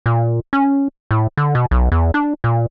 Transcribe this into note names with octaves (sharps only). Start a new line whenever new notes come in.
A#2
C#4
A2
D3
B2
B1
E2
D4
A#2